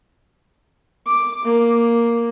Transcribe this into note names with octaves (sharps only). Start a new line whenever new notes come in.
D6
A#3